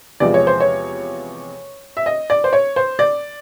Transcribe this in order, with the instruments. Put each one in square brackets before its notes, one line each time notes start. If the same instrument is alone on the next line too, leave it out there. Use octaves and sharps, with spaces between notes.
[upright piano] E2 C3 F3 G#3 D5
C#5
C5
C#5
E5
D#5
D5
C5
C#5
C5
D5